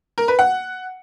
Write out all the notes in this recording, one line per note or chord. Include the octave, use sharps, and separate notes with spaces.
A#4
B4
F#5